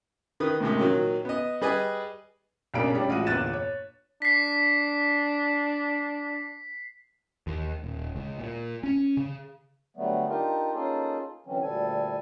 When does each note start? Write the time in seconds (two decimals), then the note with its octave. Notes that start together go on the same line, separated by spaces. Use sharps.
0.40 D#3 B4 D#6
0.60 A2 C3 D#3 G#3
0.77 A#2 D#3 F#3
1.25 B3 D#5
1.61 G3 G#4 B4 D#5 G#5
2.74 B1 C#3 A#3 D4 D7
2.94 G3 C#4 D4
3.08 A1 G#3 F4 F#4 D#7
3.26 G1 E2 A#2 F#6 A6 E7
3.53 C#5
4.22 D4 B6 C7
7.47 D#2
7.84 D#1
8.16 C#2
8.39 A#2
8.83 C#4
9.17 C#3
9.97 D3 F#3 G3 A3 B3
10.29 D4 D#4 F4 G4 A#4
10.74 A#3 C#4 D#4 F4 G#4 A4
11.46 D3 E3 F#3 C4 C#4
11.62 D2 A#2 G3 A4 G#5